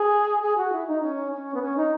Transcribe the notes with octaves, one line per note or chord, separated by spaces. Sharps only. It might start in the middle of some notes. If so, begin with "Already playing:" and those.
Already playing: G#4
G#4
F#4
E4
D#4
C#4
C#4
B3
C#4
D#4